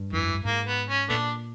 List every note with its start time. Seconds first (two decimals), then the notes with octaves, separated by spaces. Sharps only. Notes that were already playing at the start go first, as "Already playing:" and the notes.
Already playing: G2
0.13 F2 E3
0.23 F#2
0.34 G2
0.45 G#2 A#3
0.67 B3
0.89 C#4
1.09 A#2 A3 B3 D4